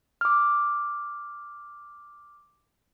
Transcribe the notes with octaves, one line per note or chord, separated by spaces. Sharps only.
D6 F6